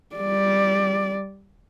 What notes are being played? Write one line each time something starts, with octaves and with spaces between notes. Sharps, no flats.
G3 D5